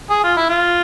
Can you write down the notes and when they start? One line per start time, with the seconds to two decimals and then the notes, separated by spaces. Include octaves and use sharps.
0.10 G#4
0.24 F4
0.37 E4
0.49 F4